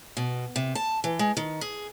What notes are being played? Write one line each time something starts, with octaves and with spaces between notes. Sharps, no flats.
B2
C3
A5
E3
G#3
D#3
G#4